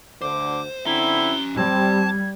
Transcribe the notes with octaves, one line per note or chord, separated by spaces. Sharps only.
D2 D3 C5 D6
D3 C4 C#4 E4 A#5 G7
G3 C4 A5 G#6